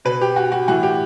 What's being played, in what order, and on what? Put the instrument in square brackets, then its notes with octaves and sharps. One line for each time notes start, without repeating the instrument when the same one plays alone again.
[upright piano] B2 B4
G4
F#4
F#4
A2 E3 F#4
G4